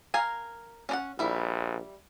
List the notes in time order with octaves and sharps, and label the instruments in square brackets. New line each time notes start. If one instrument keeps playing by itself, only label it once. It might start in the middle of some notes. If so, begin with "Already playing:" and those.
[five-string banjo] A#4 F5 G#5
C#4 D4 F#5
[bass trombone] A#1 [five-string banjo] G3 E4